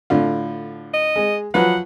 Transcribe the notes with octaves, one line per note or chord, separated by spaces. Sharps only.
A2 D3 F4
D#5
G#3
F3 F#3 B4 F#5